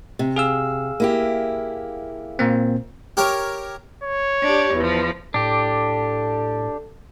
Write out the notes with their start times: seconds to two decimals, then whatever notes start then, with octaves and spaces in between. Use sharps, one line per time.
0.19 C3
0.36 G#4 F5 E6
1.00 A#3 E4 G4
2.39 A#2 A#3 C4
3.17 G4 A#4 C#5
4.04 C#5
4.44 D4 G4
4.75 E2 F3
5.34 A2 D4 G4 A4